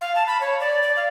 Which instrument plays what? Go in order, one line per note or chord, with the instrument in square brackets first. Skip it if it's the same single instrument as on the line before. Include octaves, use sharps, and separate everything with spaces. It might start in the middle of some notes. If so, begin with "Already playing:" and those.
[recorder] F5
A5
B5
C#5
D5
D5
F5